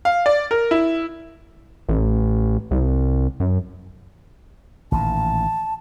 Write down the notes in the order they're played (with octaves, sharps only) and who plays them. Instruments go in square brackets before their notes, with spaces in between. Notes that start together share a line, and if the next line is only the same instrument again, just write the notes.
[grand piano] F5
D5
A#4
E4
[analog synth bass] A1
C2
F#2
[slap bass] A1 A#2 D#3 [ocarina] A5